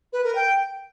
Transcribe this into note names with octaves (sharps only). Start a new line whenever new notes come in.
B4
A#4
G5